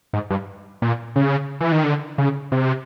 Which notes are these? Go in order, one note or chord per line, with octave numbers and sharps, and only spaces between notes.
G#2
G2
A#2
C#3
E3
D#3
D3
C#3
C3